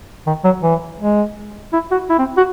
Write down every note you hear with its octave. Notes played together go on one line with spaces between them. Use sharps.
D#3
F#3
E3
G#3
E4
F#4
E4
C4
F#4